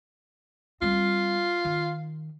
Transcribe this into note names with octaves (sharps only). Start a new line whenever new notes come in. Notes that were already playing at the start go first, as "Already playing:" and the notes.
G3 C4 F4
D#3